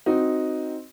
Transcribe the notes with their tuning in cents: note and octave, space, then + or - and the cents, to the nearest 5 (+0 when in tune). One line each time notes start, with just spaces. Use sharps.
C4 +0 D#4 +0 F#4 +0